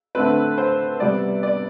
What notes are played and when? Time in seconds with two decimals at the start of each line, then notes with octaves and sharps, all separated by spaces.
0.15 D3 A3 C4 B4
0.58 C5
1.00 C3 G3 B3 D5
1.43 D5